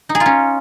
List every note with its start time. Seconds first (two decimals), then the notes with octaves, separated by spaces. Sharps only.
0.09 D#4
0.15 G#4
0.20 F4
0.26 C#4